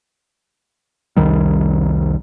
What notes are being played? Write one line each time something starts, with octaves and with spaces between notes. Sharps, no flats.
C2 F2 D#3 G3